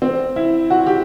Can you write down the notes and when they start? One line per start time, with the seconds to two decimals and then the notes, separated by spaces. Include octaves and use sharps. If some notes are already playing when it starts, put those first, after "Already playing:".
0.02 C4
0.36 E4
0.70 F#4
0.87 G4